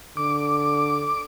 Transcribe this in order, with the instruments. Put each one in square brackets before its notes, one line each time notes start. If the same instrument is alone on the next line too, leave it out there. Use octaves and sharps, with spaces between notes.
[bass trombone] D3 [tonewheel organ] D6